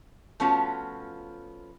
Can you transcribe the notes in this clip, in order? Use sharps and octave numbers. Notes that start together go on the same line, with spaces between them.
F3 A3 B3 C#4 F4 F#4